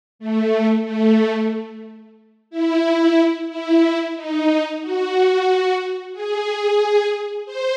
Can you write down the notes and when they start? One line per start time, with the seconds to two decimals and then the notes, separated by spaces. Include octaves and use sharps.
0.19 A3
0.85 A3
2.50 E4
3.49 E4
4.16 D#4
4.82 F#4
6.13 G#4
7.46 C5